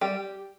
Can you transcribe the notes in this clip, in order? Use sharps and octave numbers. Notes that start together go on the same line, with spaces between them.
G3 G4